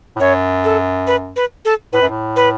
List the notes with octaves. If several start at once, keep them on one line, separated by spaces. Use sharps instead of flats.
A2
F#2 C#5
A4
B4
B4
A4
A2 B4
F#2
A2
B4